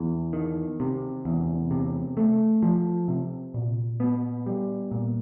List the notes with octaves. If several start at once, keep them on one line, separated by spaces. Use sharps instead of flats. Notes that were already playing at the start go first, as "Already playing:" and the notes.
Already playing: E2
D#3
C3
E2
C3
A3
F3
C3
A#2
B3
G3
A#2